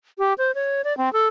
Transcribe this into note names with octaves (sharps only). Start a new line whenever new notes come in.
G4
C5
C#5
D5
C4
A4